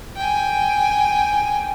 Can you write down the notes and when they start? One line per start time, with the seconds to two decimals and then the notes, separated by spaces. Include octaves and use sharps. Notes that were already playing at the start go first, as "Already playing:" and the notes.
0.17 G5 G#5